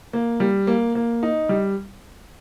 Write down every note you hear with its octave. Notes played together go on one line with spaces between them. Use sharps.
A#3
G3
A#3
A#3
D#4
G3